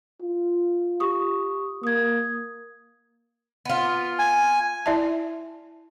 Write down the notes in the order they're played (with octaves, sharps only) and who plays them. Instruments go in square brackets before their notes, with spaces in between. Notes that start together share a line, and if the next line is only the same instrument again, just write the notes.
[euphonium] F4
[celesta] G4 C#6 D#6
[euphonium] A#3 [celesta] D#6 G#6
[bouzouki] B3 F4
[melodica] G#5
[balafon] E4 D5 E5 A5